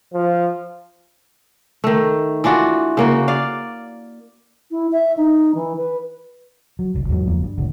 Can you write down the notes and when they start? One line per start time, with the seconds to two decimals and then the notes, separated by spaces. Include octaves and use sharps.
0.14 F3
1.84 D#3 A3
2.44 E3 D4 F4 F#4
2.97 C#3 A#3 F#4
3.28 D5 F5
4.71 E4
4.92 E5
5.17 D#4
5.55 E3
5.77 B4
6.79 F#3
6.94 F#1 C2
7.09 E2 G#2 D#3 F#3
7.27 F#1 E2 F3 A#3
7.43 G2
7.58 F1 C2 A2 D3